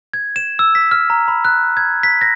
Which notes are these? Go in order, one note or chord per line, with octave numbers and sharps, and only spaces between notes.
G#6
E7
E6
B6
F6
A#5
B5
F#6
G#6
B6
A#6